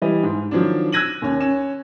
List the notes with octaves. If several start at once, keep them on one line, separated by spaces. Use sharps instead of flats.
E3 G3 D#5
G#2
D#3 F3 F#3 D4
E6 F#6 G#6 A#6 D#7 F#7
D#2 C#4
C#4 E7